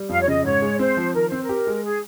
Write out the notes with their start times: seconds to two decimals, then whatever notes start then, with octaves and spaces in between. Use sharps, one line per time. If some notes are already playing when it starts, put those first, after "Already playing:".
Already playing: G3
0.09 F2 F5
0.21 C#5
0.28 C#3 D#5
0.44 G#2 C#5
0.62 G#3
0.79 C4 C5
0.97 F3
1.14 D#3 A#4
1.28 C4 C5
1.42 A#4
1.49 G4
1.67 G#3
1.84 G#4